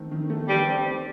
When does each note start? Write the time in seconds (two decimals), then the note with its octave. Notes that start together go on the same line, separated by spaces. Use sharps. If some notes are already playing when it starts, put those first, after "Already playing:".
Already playing: D#3 A3 C4
0.11 D#3
0.30 A3
0.48 G2 D#3 G3
0.67 C4
0.85 C4